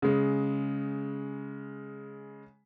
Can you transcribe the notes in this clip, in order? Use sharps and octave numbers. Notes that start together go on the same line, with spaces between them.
C#3 G#3